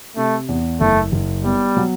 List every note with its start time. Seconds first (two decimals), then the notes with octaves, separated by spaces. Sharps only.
0.17 C3 A3
0.49 E2
0.81 F#1 A3
1.12 F#1
1.44 G3 B3
1.77 F#3